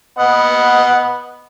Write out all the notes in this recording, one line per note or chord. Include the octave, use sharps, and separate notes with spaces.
B3 D#5 F#5